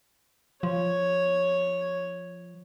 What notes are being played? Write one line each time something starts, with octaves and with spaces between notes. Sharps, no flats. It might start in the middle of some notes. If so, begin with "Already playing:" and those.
F3 C#5